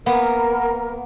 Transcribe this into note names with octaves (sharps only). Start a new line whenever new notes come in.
A#3 B3 A#4